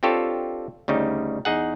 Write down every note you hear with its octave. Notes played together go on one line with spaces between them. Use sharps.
C4 D4 F4 G4 A4 C#5
D2 C#3 G3 D#4
E2 D#4 G#4 F#5